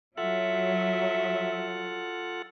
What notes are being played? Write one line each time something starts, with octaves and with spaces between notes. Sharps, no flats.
F#3 F4 A4 E5 F#5